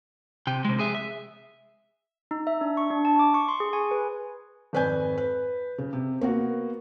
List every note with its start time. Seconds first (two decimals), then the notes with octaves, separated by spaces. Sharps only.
0.47 C3 G5
0.65 C3 G#3
0.79 G#4 E5
0.95 E5
2.31 D#4
2.47 E5
2.61 D4
2.77 C#6
2.91 D4
3.05 A5
3.19 D6
3.34 C#6
3.48 C6
3.60 G#4
3.73 G#5
3.91 B4
4.73 G#1 F2 B4 D5 G#5 G6
5.18 B4
5.78 C#3
5.93 C3
6.21 A#3 B3 F#4